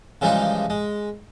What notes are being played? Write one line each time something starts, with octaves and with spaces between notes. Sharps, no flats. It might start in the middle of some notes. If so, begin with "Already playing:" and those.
C#3 E3 F3 G3 G#3 D#4
G#3